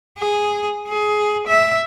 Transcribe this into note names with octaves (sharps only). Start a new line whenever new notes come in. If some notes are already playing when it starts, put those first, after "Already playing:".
G#4
G#4
E5